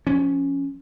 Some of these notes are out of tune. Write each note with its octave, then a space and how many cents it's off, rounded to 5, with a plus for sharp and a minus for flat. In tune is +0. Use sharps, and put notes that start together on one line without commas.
F3 +0 C#4 +0